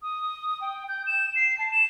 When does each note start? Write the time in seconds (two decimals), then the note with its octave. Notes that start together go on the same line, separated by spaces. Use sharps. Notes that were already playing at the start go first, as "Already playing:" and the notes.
0.02 D#6
0.61 G5
0.89 G6
1.07 E7
1.36 C7
1.58 A5
1.72 E7